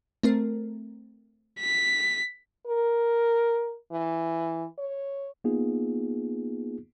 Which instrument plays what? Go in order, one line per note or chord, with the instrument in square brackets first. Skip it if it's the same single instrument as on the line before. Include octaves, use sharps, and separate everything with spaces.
[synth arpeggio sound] A3 C4 A#4
[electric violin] B6
[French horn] A#4
E3
C#5
[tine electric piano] A#3 B3 D#4 F4 G#4